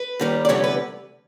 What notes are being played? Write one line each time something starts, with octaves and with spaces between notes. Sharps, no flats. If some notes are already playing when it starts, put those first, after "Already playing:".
Already playing: B4
D#2 D#3 G3
D5
D2 C3 E3 G3 B3 C#5
B4